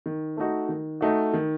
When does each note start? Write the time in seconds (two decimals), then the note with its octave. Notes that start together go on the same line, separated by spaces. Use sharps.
0.06 D#3
0.37 A3 D#4 F#4
0.69 D#3
1.01 A3 D#4 F#4
1.34 D#3